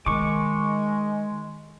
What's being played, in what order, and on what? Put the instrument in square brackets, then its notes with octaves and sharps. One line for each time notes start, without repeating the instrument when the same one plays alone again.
[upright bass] D#3 [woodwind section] G#3 [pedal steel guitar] C#6 D6